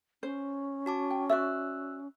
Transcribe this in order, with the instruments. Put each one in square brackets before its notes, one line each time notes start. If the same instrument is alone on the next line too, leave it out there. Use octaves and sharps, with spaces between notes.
[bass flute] C#4 [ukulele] C5
[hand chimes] F#4 A5 D6
[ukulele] G5
[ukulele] F#4 D5 E5 [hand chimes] E6 F#6